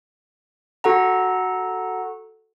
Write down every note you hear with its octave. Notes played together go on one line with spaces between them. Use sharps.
F#4 A4 F#5 A#5